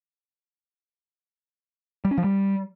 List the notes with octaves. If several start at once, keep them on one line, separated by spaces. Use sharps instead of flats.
G3
C#4
F3
G3